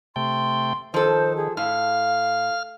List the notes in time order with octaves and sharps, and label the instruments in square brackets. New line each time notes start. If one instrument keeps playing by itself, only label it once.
[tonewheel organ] C3 A3 G5 [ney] C6
[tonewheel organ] D#3 [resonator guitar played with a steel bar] F3 A4 [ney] C5
[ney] G#4
[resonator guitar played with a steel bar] A2 [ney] F5 [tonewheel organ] F6